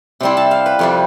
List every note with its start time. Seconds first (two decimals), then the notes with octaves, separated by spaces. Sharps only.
0.20 C3 G3 C4 E4 C6
0.37 A5
0.51 F5
0.66 B4
0.79 F2 C3 G3